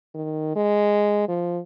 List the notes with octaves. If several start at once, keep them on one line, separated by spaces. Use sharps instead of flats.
D#3
G#3
F3